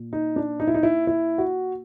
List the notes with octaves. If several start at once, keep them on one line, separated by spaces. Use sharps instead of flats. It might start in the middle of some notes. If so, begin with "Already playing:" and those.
Already playing: A#2
D#4
D4
D#4
E4
D#4
E4
E4
F#4